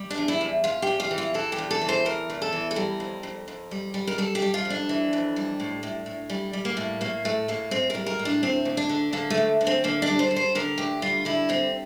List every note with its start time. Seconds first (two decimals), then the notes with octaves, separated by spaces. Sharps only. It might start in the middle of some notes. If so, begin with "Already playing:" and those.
Already playing: G3
0.10 D4
0.18 E2
0.28 E4
0.41 E2
0.64 E2 F4
0.82 E2 G4
1.00 F4
1.11 E3
1.18 F4
1.34 E3 A4
1.52 G4
1.58 E2
1.71 A4
1.81 E3
1.89 C5
2.05 E2 A#4
2.30 E2
2.42 A4
2.53 E3
2.71 A4
2.76 G3 A#4
3.00 F2
3.23 F2
3.48 F2
3.71 G3
3.94 G3
4.07 A#4
4.18 G3 A4
4.35 G4
4.42 G3
4.54 F4
4.65 F2
4.70 D4
4.89 E3
5.13 F2
5.36 G3
5.60 A2
5.83 A2
6.06 A2
6.30 G3
6.53 G3
6.65 A#3
6.77 A2
7.01 A2 A#3
7.25 A2 A3
7.48 A2 A#3
7.71 A2 C4
7.90 G3 A#4
8.06 A#4
8.19 A2
8.25 D4
8.43 D2 C4
8.65 D2
8.77 D4
8.89 D3
9.13 D3 A#3
9.30 A3
9.37 D2
9.61 D2
9.67 C4
9.84 D3 A#3
10.02 D4
10.07 G3
10.19 C5
10.31 G3
10.36 C5
10.55 D3 A#4
10.78 D2 G4
11.02 G3 F4
11.25 D3 E4
11.49 G3 C4